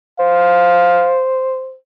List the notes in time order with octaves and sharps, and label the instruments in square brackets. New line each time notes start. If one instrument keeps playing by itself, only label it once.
[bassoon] C5 [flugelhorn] F5